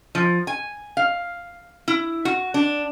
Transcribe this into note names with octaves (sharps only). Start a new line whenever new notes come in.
F3
G#5
F5
E4
F#4
D4